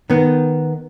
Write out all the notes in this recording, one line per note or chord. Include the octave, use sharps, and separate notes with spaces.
D#3 B3